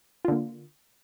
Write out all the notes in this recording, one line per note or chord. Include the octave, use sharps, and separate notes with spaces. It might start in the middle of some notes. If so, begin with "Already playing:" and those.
D3 A#3 F4